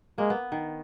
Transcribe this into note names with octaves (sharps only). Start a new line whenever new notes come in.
G#3 A#3
B3
D#3